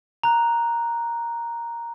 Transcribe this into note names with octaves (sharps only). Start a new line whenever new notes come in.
A#5 F#6